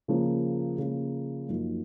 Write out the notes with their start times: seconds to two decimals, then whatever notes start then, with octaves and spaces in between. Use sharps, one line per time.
0.08 C#3 F3 A#3
0.78 C#3 F3 A#3
1.49 F#2 F3 A#3 D#4